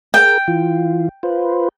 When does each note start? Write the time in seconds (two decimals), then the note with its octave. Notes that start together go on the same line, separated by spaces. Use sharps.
0.14 G#4 A#4 G5
0.48 E3 F4
1.23 F4 B4 C5